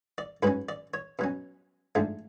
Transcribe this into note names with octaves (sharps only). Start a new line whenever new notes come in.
D5
G#2 F#3 C#4 B4
D5
C#5
B2 F#3 C#4
G#2 F3 A3 D4